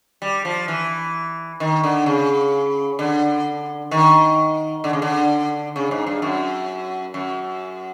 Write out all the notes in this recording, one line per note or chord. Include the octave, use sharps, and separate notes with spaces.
G3
F3
E3
D#3
D3
C#3
D3
D#3
D3
C#3
D3
C#3
G#2
G2
F#2
F#2